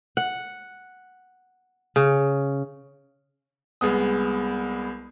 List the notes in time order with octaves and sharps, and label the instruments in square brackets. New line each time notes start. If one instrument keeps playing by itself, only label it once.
[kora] F#5
C#3
[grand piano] C2 G#3 B3 D#6